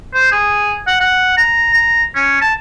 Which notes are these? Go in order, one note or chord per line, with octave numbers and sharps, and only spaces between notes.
C5
G#4
F#5
F#5
A#5
A#5
C#4
A5